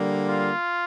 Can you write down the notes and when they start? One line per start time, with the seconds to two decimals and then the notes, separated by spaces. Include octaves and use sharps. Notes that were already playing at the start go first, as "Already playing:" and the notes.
Already playing: D3 G3 A#3
0.27 F4